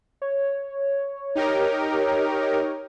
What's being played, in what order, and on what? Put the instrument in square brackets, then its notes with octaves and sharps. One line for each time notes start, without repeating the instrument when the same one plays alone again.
[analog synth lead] C#5
[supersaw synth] D#4 G4 A#4